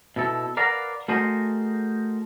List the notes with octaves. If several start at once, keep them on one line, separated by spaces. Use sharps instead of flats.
B2 E4 A4
A#4 B4 D5 F5 F#5 A#5
A3 F#4 G#4 A#4 C5 D#5